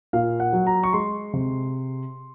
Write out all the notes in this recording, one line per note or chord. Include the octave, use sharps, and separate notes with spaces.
A#2 F5
F#5
F#3
A#5
C#6
G#3 C6
C3